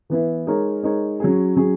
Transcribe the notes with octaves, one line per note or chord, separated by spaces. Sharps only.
E3 B3 E4
G#3 D#4 A#4 C#5
G#3 D#4 A#4 C#5
F#3 C#4 G#4
F#3 C#4 G#4